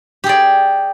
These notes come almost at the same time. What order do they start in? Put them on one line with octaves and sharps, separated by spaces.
G4 G#4 D5